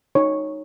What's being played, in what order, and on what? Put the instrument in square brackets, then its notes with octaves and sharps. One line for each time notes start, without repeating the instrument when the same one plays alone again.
[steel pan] D#4 C#5